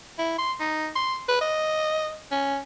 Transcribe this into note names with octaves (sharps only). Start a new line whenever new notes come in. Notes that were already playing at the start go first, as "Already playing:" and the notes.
E4
C6
D#4
C6
B4
D#5
C#4